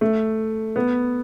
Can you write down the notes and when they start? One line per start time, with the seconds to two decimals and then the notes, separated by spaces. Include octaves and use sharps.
0.01 A3
0.76 B3